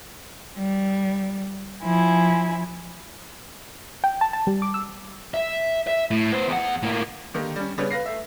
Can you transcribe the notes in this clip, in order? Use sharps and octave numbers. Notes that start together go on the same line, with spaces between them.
G3
F3 E4 G#5
G5
A5
A5
G3
D6
E6
E5
E5
A2
B3 C5
E2 F#5
A2 A#3
D3 D#3 A#3 D#4 G4
G3 C#4
C#3 G3 B3 G4 B4 C#5
B4 F5 A#6 C7
A3 E5